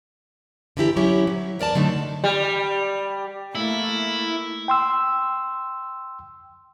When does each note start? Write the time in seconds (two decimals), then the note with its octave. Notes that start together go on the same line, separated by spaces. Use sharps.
0.77 D3 E3 E4 G4 A#5
0.96 F#3 C#4 E4 G4 C#5
1.27 F#3
1.59 E2 A#4 D5 A5
1.75 D3 F#3 A3 D#4
2.24 G3
3.55 A3 A#3 E4
4.68 G5 C6 E6